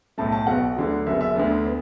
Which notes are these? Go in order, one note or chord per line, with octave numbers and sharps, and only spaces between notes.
B1 A2 A3 A5
A5
B1 B2 B3 F#5
D2 D3 F#3
F#1 F#2 F#3 B3 E5
E5
D2 D3 B3
B3